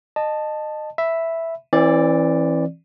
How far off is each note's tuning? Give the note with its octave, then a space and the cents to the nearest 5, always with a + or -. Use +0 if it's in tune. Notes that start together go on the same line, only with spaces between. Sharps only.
D#5 -25 A5 +0
E5 +0 B5 +0
E3 +0 C4 +45 D5 +0